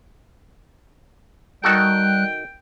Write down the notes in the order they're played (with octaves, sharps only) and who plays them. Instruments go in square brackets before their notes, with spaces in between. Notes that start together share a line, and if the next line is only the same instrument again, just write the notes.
[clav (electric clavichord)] D#3 F#4 A4 [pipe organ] G3 F#6 [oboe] G5